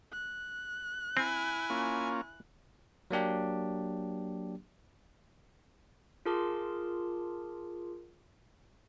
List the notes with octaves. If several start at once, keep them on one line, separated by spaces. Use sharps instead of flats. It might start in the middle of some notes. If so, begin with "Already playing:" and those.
F#6
C4 E4 G#5
A#3 C#4 F4
F#3 A#3 D4 G4
F4 G#4 A#4 A5 C6 D6